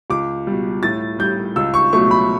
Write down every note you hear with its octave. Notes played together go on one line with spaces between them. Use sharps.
C#2 D6
B2 G3
A2 A6
G3 G6
C#2 E6
C#6
B2 F#3 A3 C#6
B5